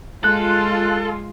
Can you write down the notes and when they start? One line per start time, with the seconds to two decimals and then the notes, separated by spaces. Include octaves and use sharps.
0.24 G#3 F4 A4 F#6